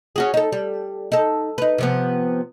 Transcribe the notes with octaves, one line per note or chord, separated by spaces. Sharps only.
C#4 F#4 G#4
D#4 A4
G3
D#4 A4
D#4 B4
C3 F3 B3